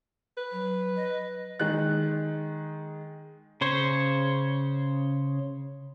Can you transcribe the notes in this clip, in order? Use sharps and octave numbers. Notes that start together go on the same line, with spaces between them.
B4
F#3
D#5
D#3 G#3 F#6
C#3 C5 C#5